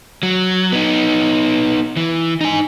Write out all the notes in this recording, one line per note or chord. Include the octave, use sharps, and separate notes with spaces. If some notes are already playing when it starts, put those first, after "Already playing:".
F#3
B3 D#4
E3
D#4 G#5